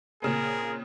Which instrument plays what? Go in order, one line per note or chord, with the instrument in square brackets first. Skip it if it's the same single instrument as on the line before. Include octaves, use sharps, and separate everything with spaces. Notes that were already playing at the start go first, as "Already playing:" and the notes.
[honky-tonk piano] A#2 C#3 C4 [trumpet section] G#4 A#4